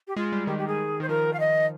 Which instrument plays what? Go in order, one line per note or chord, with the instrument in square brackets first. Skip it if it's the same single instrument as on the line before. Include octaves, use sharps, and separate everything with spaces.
[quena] G4
[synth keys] G#3 [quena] F4
[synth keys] G3
[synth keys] D#3 [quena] G4
[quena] G4
G#4
[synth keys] D#3 [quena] C5
[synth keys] F3 [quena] A#4
[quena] F5
D#5